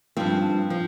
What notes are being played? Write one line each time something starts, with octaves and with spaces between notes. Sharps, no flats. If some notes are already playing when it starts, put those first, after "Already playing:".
G2 F3 C4
F3